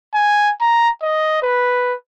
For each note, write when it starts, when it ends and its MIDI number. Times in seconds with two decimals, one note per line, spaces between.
0.14 0.51 80
0.61 0.90 82
1.02 1.39 75
1.43 1.94 71